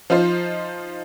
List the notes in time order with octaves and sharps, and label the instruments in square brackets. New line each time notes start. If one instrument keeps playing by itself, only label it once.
[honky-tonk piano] F3 D#4 F4 C5